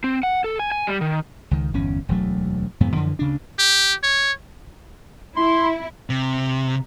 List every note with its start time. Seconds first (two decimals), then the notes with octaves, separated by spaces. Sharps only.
0.04 C4
0.23 F#5
0.44 A4
0.59 G#5
0.72 G#5
0.87 G3
1.01 D#3
1.51 C#2 D#3
1.74 G1 E2 C#4
2.09 E1 D2 F#3 A3
2.80 F2 G#2 C3 B3
2.95 F#2 D3 E3 F3
3.19 D2 C#3 D4
3.59 G4
4.03 C#5
5.37 E4 C6
6.10 C3